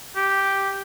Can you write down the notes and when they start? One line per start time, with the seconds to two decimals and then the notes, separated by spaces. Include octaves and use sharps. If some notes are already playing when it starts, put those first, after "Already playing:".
0.16 G4